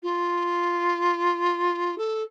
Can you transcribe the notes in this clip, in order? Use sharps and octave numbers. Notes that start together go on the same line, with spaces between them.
F4
A4